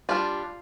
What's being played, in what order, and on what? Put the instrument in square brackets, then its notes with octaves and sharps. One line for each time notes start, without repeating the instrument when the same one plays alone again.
[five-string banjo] G3 D4 F4